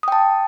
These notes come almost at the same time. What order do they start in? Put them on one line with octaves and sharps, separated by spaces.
D#6 G5 A5